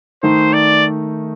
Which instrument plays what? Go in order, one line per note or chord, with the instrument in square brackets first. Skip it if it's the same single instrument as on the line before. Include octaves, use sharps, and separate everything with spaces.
[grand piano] D#3 A3 D#4 [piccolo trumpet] C5
[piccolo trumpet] D5